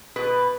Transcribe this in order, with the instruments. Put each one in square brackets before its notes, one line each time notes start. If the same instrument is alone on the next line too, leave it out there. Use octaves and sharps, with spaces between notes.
[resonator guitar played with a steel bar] B2 B4